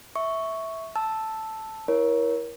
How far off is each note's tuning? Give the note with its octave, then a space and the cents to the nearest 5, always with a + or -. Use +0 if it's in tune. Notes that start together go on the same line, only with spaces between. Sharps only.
E5 -10 C#6 +0
A5 +0 E6 +0
E4 +0 A#4 +25 C#5 +0